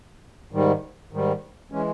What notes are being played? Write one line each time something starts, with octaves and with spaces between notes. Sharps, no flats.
G#2 D#3 G3
G#2 D#3 G3
E3 G#3 C#4